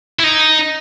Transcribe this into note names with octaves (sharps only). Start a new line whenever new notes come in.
E4
D#4